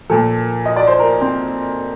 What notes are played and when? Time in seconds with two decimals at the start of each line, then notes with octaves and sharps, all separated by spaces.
0.09 A#2 F3 A4
0.66 D#5
0.76 D5
0.87 C5
0.99 A#4
1.21 C4